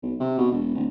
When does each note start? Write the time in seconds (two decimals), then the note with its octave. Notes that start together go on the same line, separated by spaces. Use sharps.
0.03 B1
0.20 C3
0.38 B2
0.51 E1
0.74 D1